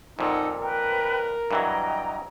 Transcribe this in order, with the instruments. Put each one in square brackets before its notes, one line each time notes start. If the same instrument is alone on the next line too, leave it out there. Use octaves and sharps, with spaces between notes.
[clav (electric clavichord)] F2 A#2 [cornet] D#4 [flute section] F#5 A5 E6
[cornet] A#4 [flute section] B4 G5
[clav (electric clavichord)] G2 E3 F#3 [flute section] D#5 G5 A#5